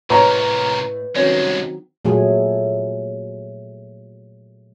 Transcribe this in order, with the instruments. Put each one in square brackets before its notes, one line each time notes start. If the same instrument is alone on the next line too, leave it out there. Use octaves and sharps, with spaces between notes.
[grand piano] A2 D#5 [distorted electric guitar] C3 A#4 [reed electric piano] B4 [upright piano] C#5 A#5 C#6
[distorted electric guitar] C2 G#3 [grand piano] D#3 F#3 C4 [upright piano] C#4
[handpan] A#2 F#3 A3 G#4